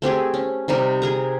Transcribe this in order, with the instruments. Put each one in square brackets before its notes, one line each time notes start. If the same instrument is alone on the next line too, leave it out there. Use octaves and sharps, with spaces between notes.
[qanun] A3 C4 G4 G#4
C#4
C3 G3 D#4 A#4
G#4 A#4 A#5